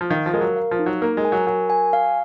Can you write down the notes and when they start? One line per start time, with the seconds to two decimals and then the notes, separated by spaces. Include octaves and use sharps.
0.01 F3
0.10 D#3 F5
0.26 F3
0.34 G#3 A#4
0.41 F#3
0.56 F5
0.71 F3
0.79 D#4
0.86 F#3
1.02 A#3 A#4
1.17 G#3
1.25 G#5
1.32 F#3
1.47 F#3 A#4
1.70 G#5
1.93 F5